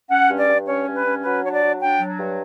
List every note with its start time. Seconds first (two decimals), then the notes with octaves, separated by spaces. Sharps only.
0.10 C#4 F#5
0.30 G2
0.39 D5
0.48 G2
0.67 C#4 C#5
0.86 G2
0.95 B4
1.05 C#4
1.24 F#3 B4
1.43 D4 C#5
1.53 D5
1.62 F#3
1.81 D4 G5
2.00 F#3
2.19 G2